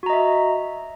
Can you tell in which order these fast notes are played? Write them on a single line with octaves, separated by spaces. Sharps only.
F#4 A#5 D#5 E5